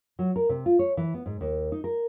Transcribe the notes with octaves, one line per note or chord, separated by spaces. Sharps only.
F#3
A#4
C3
F4
C#5
E3
B3
G#2
D#2
D#4
A#4